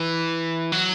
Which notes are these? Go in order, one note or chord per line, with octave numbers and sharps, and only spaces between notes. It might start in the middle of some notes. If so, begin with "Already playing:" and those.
Already playing: E3
F#3